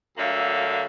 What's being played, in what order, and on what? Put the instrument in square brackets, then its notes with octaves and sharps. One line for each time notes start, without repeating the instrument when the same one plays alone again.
[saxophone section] D2 D3 F#3 A#3 E5 F5